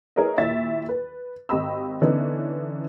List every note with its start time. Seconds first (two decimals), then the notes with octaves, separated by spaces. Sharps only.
0.16 E4 G#4 A#4 B4 C#5 D#5
0.38 D#2 A#2 E4 E5 A6
0.89 B4
1.49 G#1 G4 D#5 B5 E6
2.02 D3 E3 B3 C#4 D#4